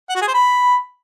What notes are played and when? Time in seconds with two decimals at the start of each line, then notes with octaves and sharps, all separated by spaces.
0.09 F#5
0.15 F#4
0.22 G#4
0.28 C5
0.34 B5